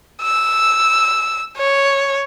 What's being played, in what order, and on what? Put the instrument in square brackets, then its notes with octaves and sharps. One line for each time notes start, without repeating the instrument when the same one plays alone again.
[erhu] E6
C#5